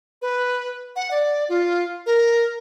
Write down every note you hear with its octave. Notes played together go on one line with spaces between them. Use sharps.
B4
F#5
D5
F4
A#4